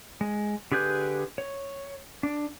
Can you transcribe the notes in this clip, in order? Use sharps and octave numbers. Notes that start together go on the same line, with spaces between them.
G#3
D3 G4 G#4 B4 G6
C#5
D4